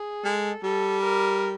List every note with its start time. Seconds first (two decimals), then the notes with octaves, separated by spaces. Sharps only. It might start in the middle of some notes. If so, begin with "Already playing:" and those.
Already playing: G#4
0.24 G#3 A4
0.63 G3 A4
1.02 A#4